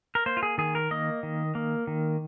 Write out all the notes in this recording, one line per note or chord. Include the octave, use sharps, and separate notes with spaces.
A#4
A#3 C5
F4
G#4
D#3 G#4
A#4
A#3 D#5
D#3
A#3
D#3